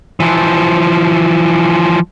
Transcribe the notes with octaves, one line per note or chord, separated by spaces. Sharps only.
E3 F3